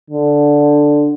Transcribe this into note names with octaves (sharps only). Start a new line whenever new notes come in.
D3